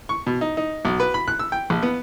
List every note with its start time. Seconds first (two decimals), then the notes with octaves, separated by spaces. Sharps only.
0.09 C#6
0.27 B2
0.41 D#4
0.57 D#4
0.85 B1
1.00 B4
1.14 B5
1.28 F#6
1.39 E6
1.52 G5
1.70 A#1
1.82 B3